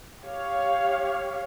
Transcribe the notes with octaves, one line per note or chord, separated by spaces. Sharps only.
G4 C#5 F5